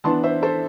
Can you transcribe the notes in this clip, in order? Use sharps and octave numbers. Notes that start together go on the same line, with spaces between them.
E3 B3 D4 A5 C6
C5 E5
A4 C5